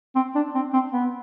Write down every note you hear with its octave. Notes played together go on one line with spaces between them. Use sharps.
C4
D4
C4
C4
B3